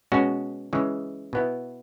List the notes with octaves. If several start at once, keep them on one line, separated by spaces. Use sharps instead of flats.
B2 G#3 C#4 F#4
C#3 E3 G#3
B2 B3 E4